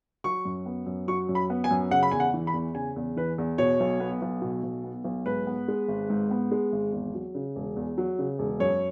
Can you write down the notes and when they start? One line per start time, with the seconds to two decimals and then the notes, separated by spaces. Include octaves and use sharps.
0.24 F#3 C#6
0.45 F#2
0.66 B3
0.87 F#2
1.08 F#3 C#6
1.29 F#2
1.35 B5
1.50 B3
1.64 G#5
1.71 F#2
1.91 C#3 F#5
2.03 B5
2.11 E2 G#5
2.20 F#5
2.34 E3
2.47 B5
2.54 E2
2.75 C#3 G#5
2.96 E2
3.16 E3 B4
3.38 E2
3.58 B2 C#5
3.80 B1
4.00 B3
4.22 B1
4.42 B2
4.63 B1
4.84 B3
5.05 B1
5.25 G#2 B4
5.47 B3
5.68 G#3
5.88 G#1
6.10 G#2
6.31 B3
6.51 G#3
6.73 G#1
6.93 E2
7.15 F#3
7.35 C#3
7.56 E1
7.76 E2
7.98 F#3
8.19 C#3
8.39 E1
8.60 F#2 C#5